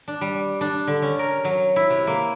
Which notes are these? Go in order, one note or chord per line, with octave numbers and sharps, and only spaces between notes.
D4
G3
D4
D3
C#4
A#4
F#3
E4
C3
A#3